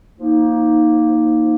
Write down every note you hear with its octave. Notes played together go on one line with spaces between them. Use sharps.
F3 A#3 D#4